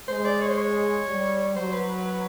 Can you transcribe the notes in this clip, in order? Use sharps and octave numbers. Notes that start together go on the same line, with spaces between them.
G#3 C5
D5
C#5
C5
C#5
G3
F#3 C5
B4
B4
B4